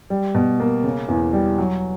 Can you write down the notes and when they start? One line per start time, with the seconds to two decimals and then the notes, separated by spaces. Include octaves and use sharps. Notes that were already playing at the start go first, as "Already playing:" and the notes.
0.10 G3
0.35 B2
0.60 A#3
0.84 C#3
1.08 E2
1.33 G3
1.58 F#3